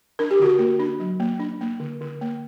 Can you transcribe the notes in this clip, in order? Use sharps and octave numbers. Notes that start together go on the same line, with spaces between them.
D4 A#4
G4
D3 F#4 A#4
A#3
D4
F#3
A#3
D4
A#3
D3
D3
A#3